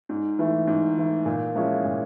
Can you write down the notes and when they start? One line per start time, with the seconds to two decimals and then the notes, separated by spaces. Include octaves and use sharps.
0.09 G#2
0.39 E3 A3
0.67 G#2
0.97 E3 A3
1.26 A#2
1.55 F3 G#3 C#4 E4
1.85 A#2